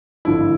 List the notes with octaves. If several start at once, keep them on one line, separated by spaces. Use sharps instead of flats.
G#1 G2 D3 F3 E4